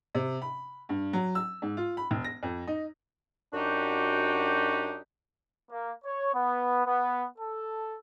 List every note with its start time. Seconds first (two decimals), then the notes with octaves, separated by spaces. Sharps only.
0.15 C3
0.42 B5
0.89 G2
1.13 F#3
1.35 E6
1.62 G#2
1.77 F4
1.97 B5
2.11 E1
2.24 A#6
2.43 F2
2.68 D#4
3.53 F#2 D4 D#4 F#4 G4
5.70 A#3
6.03 C#5
6.34 B3
6.85 B3
7.38 A4